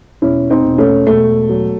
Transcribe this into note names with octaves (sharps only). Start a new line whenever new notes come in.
E1 C#4 E4
C4 D#4
E1
A3 C#4
E1 A3
F#3